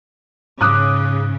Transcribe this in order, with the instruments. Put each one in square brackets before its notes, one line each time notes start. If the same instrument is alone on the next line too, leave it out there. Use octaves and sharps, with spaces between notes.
[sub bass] G#2 [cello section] C#3 [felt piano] D6 D#6 F#6